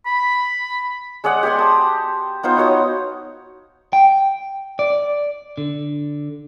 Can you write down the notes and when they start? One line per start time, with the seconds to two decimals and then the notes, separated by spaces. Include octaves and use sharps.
0.06 B5
1.24 G#3 G#4 D5 F#5
1.43 G4 G#4 G#5 C6
1.59 A5 D#6
2.43 B3 D#4 F4 C5
2.57 D#4 F#4 C#5 D#5
3.93 G5
4.79 D5
5.58 D3